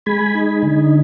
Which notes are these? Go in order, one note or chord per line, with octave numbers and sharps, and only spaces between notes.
G#3 G#5 B5
D#4
D3